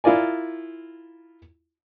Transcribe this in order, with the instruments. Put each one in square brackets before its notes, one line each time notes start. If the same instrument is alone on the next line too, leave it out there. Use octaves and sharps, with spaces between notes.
[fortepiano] E4 F4 A#4 D5 G#5